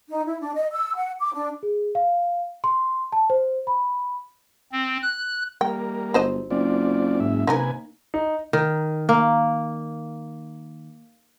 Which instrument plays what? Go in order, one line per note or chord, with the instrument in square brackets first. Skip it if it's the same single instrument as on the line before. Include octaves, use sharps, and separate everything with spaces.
[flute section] D#4
E4
D4
D#5
E6
F#5
D6
D4
[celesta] G#4
F5
C6
A5
C5
B5
[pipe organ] C4
F#6
[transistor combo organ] G3 A#3 A#4 [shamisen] G5
[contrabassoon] G1 [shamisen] F#3 C5 D#5
[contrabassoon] F#1 [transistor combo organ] C4 F4 D5
[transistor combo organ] G#2 E5
[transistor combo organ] C3 B4 G#5 [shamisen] A#3 D#4 A#4
[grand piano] D#4
[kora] D#3
A#3